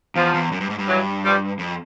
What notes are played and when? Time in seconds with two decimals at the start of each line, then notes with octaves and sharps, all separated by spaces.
0.16 E2 F3
0.34 E2
0.52 F#2
0.60 G2
0.70 G#2
0.79 G2
0.88 E3 F#3
1.24 F3 G3
1.59 F2